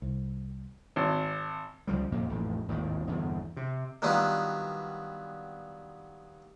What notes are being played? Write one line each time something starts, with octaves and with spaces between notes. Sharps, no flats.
C2
G#1
C#2 F3 G3
F2 A#2 A#3
A1 F2 A2
G#1 D#2 A2 D#3
G1 E2 B2
C3
D#3 F#3 G3 B3 D4 F4